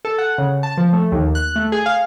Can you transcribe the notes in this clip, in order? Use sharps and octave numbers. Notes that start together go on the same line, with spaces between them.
A4
F#5
C#3
A5
F3
A3
D#2
F#6
A3
G#4
F5